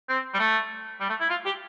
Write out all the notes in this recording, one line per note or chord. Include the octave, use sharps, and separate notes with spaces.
C4
G3
A3
G3
A3
E4
F4
G4